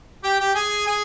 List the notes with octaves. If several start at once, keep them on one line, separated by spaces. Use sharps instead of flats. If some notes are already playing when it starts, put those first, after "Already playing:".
G4 G5
G4 G5
G#4 G#5
G#4 G#5